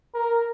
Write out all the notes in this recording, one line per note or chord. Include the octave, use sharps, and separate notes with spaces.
A#4